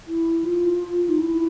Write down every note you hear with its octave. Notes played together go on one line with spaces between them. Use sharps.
E4
F4
D#4
E4